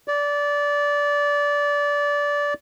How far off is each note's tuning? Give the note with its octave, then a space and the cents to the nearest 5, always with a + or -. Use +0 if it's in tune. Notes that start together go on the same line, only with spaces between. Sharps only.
D5 -20